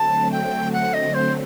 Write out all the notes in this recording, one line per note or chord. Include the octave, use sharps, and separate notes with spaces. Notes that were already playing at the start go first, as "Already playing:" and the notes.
Already playing: D3 F#3 A3 C4 A5
G5
F#5
D#5
C5